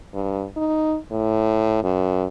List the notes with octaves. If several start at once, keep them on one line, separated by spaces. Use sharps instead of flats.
G2
D#4
A2
F#2